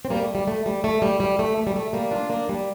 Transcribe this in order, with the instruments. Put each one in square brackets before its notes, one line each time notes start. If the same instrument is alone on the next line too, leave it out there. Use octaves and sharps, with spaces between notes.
[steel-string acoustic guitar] C4
G3 A#3
A3
G3
A3
G3
A3
G3
G3
A3
A3
G3
A3
G3 A#3
D4 F4
A#3 D4
G3 A#3